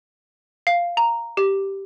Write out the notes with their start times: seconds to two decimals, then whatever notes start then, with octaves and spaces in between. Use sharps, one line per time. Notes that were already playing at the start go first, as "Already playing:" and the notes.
0.67 F5
0.97 A#5
1.37 G4